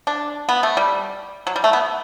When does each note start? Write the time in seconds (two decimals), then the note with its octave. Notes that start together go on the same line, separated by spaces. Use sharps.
0.07 D4
0.49 B3
0.63 A3
0.77 G3
1.47 F#3
1.56 G3
1.64 A3
1.73 B3